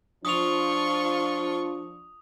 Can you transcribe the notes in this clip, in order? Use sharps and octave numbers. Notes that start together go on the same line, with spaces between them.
F3 D4 F4 C#6 D#6 F7